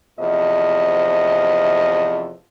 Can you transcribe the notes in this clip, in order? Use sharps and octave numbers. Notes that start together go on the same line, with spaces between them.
E2 C3 F3 A3 D#5